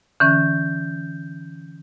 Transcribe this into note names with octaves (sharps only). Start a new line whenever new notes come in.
D3 E3 C#4 G6